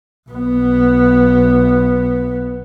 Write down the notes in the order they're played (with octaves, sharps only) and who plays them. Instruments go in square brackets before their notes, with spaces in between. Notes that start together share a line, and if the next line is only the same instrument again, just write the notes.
[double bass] B1 B3